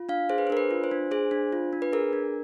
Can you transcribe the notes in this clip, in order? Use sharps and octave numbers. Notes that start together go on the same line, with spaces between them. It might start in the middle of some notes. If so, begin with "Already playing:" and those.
Already playing: F4
D4 F5
G#4 C5
B4
C5
D4 A#4
B4
F4
C5
D4
G#4 C5
D4
F4
D4
B4
G#4 A#4
D4